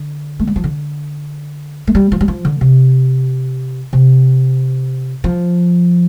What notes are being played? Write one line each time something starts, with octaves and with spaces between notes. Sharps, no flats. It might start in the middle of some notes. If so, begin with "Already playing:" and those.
Already playing: D3
A3
G3
F3
D3
A3
G3
F3
G3
F3
D3
C3
C3
F3